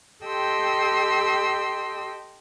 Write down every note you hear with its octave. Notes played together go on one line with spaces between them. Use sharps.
G4 A4 D#5 G5 C6 E6